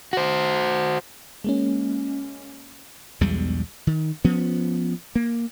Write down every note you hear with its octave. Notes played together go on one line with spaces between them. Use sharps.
F#4 C5
G#3 A#3 C#4
B1 E2 G3 G#3
D#3
F3 B3 C#4
A#3